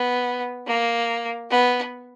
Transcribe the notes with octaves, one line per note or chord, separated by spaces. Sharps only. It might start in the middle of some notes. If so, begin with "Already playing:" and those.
Already playing: B3
A#3
B3